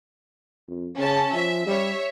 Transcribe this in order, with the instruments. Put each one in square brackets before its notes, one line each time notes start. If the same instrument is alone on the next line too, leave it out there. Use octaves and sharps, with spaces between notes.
[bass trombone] F2
[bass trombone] C#3 [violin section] C#4 A5
[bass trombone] F3 [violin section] E5
[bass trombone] G3 [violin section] C#5 E5